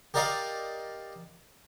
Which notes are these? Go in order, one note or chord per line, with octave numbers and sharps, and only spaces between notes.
G4 A#4 D5 D#5 F5